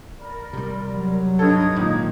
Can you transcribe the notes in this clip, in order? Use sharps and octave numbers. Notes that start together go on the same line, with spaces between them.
A#4 D5 B5
C3 G3
F#3
G2 D#4 A4 D#6 G#6
G#1 A#2 D#3